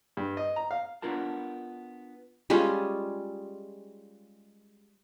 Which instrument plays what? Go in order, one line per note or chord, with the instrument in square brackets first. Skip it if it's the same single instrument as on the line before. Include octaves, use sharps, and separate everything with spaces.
[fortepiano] G2
D#5
A#5
F5
[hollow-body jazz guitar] B3 D4 F4 A#4 A5
[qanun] G3 G#3 C#4 F4